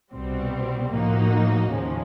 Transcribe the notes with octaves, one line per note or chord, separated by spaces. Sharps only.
C2 B2 G3 C4
A2 F3 A#3 D#4 F#4
D#2 C#3 F3 G#3 C#4